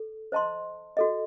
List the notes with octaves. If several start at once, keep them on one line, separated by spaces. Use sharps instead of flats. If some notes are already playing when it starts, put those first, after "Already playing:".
Already playing: A4
C5 D#5 A5 C6
F#4 A4 D#5